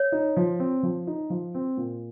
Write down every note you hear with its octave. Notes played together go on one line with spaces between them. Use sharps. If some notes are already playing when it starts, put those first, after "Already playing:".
Already playing: C#5
D#4
F3
C4
F3
D#4
F3
C4
A#2